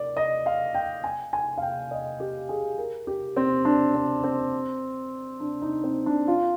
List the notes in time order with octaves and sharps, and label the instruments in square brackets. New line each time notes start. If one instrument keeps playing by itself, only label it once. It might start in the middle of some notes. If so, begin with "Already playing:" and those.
Already playing: [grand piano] A#4 D5
D#5
F5
G5
G#5
G#5
F5
G5
D#5
G4
G#4
A#4
G4
C4
D4
C4
C4
D4
D#4
C4
D4
F4